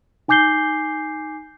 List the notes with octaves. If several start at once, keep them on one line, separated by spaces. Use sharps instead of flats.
D#4 G#5 D6 G6 C7 G7